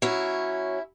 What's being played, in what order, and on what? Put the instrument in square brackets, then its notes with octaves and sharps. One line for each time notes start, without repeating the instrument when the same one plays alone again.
[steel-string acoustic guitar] F#3 C#4 E4